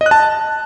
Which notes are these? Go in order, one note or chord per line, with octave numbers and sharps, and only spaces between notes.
D#5
F#6
A5